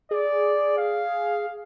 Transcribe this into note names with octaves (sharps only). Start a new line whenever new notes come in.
G#4 D5
F5